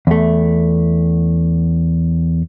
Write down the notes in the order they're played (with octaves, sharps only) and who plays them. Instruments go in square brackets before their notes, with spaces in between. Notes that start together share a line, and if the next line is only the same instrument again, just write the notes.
[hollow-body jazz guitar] E2 A3